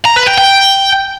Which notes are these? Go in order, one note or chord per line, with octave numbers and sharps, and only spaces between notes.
A#5
B4
G5
G5